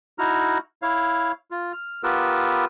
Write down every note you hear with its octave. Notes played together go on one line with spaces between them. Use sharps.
D#4 E4 F#4 A#5 F6
E4 C#5 F5
F4
F6
B3 F4 G4 A#4 B4 E6